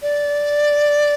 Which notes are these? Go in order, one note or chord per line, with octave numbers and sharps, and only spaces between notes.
D5